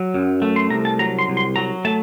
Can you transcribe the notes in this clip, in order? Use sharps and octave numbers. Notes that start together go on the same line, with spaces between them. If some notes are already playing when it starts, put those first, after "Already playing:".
Already playing: F#3
F#2
A3
C6
C2 A#5
A5
F#3 A#5
C6
C2
C6
F#3 A#5
A3 A5